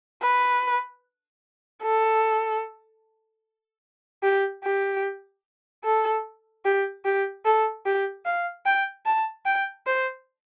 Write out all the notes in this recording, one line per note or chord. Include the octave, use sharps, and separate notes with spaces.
B4
A4
G4
G4
A4
G4
G4
A4
G4
F5
G5
A5
G5
C5